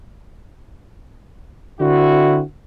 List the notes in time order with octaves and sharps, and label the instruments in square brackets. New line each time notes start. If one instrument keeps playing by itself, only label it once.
[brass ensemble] D3 C4 E4 F#4